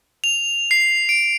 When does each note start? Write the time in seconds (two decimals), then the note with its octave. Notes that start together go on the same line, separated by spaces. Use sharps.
0.24 F7
0.71 C7
1.09 D7